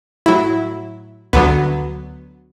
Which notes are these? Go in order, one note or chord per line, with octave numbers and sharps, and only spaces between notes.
A2 F#3 E4
D2 D3 F#3 B3